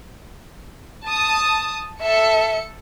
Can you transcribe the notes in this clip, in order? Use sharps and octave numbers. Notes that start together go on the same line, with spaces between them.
A5 D#6
A4 E5 C#7